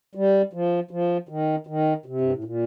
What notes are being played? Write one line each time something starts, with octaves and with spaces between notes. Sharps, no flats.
G3
F3
F3
D#3
D#3
C3
G2
A2
A#2